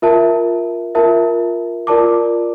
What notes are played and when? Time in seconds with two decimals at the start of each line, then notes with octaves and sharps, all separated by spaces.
0.02 F4 A#4 E5 A5
0.95 F4 A#4 E5 A5
1.87 F4 A#4 D5 A5 D6